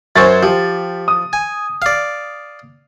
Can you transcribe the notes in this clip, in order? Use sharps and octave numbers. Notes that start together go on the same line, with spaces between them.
F#2 F#3 C#4 C5 C#6 A6
F3 G4
D#6
G#5
D5 F5